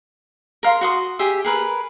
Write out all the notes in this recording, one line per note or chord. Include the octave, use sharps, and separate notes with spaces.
A#4 F5 C6
F#4 C6 D#6
G4 G#4 E5
G#4 A#4 B4